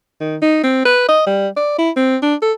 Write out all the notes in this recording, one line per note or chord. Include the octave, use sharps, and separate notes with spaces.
D#3
D#4
C4
B4
D#5
G3
D5
E4
C4
D4
A4